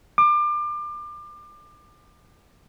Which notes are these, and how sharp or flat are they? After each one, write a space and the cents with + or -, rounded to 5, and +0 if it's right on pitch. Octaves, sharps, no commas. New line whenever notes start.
D6 +30